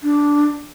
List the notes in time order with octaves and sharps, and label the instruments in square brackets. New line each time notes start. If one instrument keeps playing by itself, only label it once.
[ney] D4